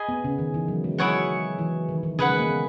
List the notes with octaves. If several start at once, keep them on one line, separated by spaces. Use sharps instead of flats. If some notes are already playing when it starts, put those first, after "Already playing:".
Already playing: G#4 D#5 G#5 B5
B3
C#3
D#3
E3
F#3
G#3
F#3 E4 G#4 C#5 F#5
E3
D#3
D#3
C#3 G#4 B4 F#5
G#3
A#3
B3